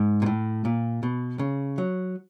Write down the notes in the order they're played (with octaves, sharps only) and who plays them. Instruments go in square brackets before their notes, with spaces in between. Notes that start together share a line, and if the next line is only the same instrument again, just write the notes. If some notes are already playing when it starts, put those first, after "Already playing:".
Already playing: [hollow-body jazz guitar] G#2
A#2
A2
A#2
B2
C#3
F#3